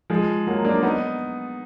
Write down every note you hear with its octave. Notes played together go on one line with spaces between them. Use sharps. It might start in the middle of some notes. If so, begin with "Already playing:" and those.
F3 G#3
F#3 A#3
A#3 D4
B3 D#4